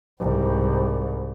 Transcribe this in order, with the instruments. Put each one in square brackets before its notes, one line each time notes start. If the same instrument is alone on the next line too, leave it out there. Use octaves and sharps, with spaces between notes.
[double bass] C2 G#2